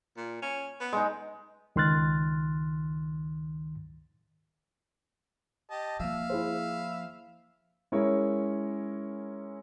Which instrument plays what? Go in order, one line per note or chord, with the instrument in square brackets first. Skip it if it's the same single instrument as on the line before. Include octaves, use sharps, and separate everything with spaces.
[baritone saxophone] A#2
C#4
B3
[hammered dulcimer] G#3 D#4
[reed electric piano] C#2 D#3 C6 F6 F#6 A6
[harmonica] G4 D#5 A5
[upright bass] F3 A#3 [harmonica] E5 F5
[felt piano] E4 G#4 C5
[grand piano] G#3 C#4 E4 A#4 C#5